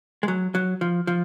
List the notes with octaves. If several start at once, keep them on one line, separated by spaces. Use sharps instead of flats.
G#3
F#3
F#3
F3
F3